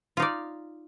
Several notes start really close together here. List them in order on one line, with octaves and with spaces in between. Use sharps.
F4 D#4 D5